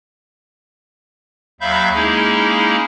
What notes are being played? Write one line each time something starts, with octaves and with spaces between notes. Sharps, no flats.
D#2 F#3 E5 F5 B5 G6
G#3 A#3 C#4 D#4 E4 G#4